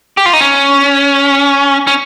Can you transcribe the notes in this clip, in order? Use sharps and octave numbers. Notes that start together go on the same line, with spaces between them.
G4
F4
D#4
C#4
C#4